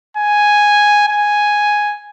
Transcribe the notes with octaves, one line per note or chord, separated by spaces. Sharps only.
G#5
G#5